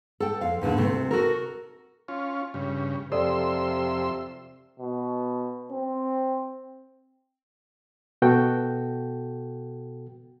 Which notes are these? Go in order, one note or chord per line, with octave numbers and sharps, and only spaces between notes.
A4 G5
F2 F5
E2 A#2 D3
D2 C3 A3
F#4 A4 A#4
C#4 F4
G2 C#3
F2 C3 A4 D5 C6 E6
B2
C4
B2 B3 F#4 A4 G5